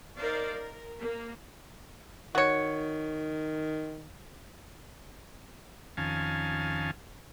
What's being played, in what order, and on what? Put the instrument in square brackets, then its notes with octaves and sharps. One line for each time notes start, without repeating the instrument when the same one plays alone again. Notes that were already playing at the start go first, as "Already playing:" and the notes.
[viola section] D#4 A#4 C5 D5 F5
A#4
A#3
[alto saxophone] D#3 [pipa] F#4 C#5
[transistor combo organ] F2 D#3 C#4 F5 G#5 A5